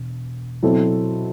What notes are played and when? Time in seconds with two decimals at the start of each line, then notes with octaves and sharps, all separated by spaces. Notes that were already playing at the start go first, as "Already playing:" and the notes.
Already playing: E1
0.63 B2 F#3 C4 E4 A4